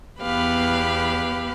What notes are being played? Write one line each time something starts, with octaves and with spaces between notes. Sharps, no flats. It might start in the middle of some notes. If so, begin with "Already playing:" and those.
E2 B3 G4 B4 F5 B5